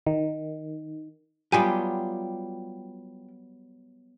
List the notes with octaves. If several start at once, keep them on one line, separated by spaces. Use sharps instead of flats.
D#3
F#3 G3 B3 F4 G4 G#5